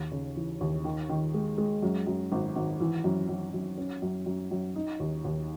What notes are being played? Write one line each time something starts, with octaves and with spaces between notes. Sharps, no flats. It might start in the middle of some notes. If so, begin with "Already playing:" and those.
Already playing: D#2
C#3
E3
D#2
D#3
D#3
G#3
G#3
F#2
F#2
G#1
G#1
E3
F#2
F#2
F#2
C#4
F#2
F#2
F#2
D#4
D#2
D#2